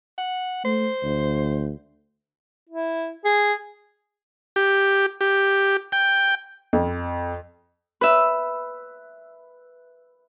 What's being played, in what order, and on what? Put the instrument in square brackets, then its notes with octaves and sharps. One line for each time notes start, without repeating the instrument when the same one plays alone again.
[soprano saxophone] F#5
[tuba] A3 [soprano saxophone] C5
[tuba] D2
[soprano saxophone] E4
G#4
[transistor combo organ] G4
G4
G5
[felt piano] F2
[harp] B4 E5